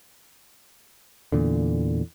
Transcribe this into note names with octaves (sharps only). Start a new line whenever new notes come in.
E2 A#2 D3